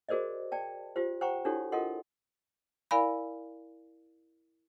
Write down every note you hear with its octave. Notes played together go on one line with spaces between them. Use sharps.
F#4 G#4 A#4 C5 D5 D#5
D5 G5 A5
F4 G4 C5
C5 F#5 G5 A#5 C#6
D4 E4 F#4 G4 A4 C#5
F4 A4 A#4 D#5 F#5 C6
E4 A#4 D5 F5 G#5 B5